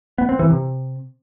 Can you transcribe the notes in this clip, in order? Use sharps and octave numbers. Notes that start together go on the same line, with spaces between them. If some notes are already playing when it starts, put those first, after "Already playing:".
B3
C4
E3
C3